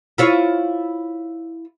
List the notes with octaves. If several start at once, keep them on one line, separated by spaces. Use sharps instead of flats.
E4 F4 C#5